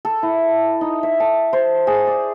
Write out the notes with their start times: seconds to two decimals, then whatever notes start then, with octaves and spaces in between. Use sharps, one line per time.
0.05 A4
0.23 E4
0.81 D#4
1.03 E5
1.20 A5
1.53 C5
1.87 G#4
2.07 D5